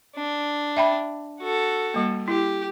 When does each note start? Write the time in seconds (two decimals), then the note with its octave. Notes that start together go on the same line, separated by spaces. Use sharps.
0.16 D4
0.77 E5 G5 B5
1.40 F#4 A4
1.94 G3 A#3
2.28 E4 G4